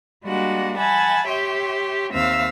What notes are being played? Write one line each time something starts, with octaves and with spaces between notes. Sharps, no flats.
G3 G#3 A#3 D4 F#4 F#5
E5 F#5 G#5 A5 B5
G4 C#5 E5 G5 C6
D#2 C4 E5 F5 E6